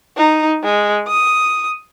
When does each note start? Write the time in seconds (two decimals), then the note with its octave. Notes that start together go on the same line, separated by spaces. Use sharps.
0.17 D#4
0.64 G#3
1.08 D#6